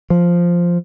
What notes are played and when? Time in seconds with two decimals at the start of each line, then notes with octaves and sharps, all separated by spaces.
0.10 F3